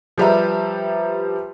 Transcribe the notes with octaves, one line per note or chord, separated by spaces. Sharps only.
F3 G3 G4 B4 E5 A#5